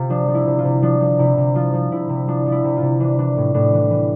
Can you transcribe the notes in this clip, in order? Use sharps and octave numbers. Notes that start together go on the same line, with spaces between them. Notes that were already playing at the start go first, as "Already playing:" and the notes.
Already playing: C3 F4 G4
F3 D4
F3
E4
C3
F4
C3
F3 D4
F3
C3 E4
C3
F3 F4
F3
C3 E4
C3
F3 D4
F3
E4
C3
F4
C3
E3 D4
E3 D4
A2
A2 D4
E3
E3